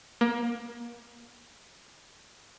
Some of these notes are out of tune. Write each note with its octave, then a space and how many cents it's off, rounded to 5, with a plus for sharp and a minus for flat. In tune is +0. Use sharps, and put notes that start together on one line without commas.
A#3 +30